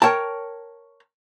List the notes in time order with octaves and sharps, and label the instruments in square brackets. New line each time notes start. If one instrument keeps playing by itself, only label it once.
[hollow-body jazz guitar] A#4 C#5 G5 A5